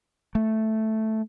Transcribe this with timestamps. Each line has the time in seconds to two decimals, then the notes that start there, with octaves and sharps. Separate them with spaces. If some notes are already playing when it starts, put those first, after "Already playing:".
0.35 A3